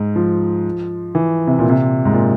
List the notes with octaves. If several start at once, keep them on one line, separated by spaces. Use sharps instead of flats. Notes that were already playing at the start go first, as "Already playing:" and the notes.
Already playing: G#2
F3
E3
C3
A#2
C3
G#2
A#2